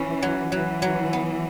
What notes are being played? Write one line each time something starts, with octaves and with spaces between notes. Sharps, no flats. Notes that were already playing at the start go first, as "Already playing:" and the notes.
Already playing: E3 C#4
F#3
E3 F#3
F#3
B3